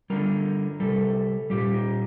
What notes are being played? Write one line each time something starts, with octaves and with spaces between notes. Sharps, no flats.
D3 G3 A#4
C3 G3 A4
A#2 G3 G4
D#4